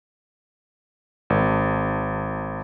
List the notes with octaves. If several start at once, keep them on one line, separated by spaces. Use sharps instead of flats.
G#1